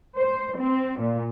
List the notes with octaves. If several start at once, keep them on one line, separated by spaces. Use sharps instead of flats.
C5
C4
A#2